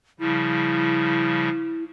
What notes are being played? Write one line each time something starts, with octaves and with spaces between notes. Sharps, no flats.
C#3 F3 G3 E4